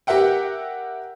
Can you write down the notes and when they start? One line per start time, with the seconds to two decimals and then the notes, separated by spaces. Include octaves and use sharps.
0.07 G4 A#4 E5 F#5 G5